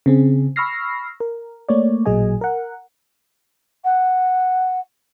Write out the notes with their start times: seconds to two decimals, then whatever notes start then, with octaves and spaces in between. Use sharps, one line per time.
0.06 C#3 C4 G#4
0.56 B5 C#6 E6 F6 A#6 C7
1.20 A#4
1.69 A3 A#3 C#5 D5
2.06 A1 A#2 F#3 G#4 D#5 G#5
2.41 A#4 F#5
3.84 F#5